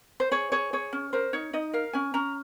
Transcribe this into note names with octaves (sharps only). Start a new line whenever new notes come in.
C5
G#4 C#5
G#4 C#5
G#4 C#5
C#4
A#4 C5
D#4 C#5
D#4 D#5
A#4 F5
C#4 G#5
C#4 A#5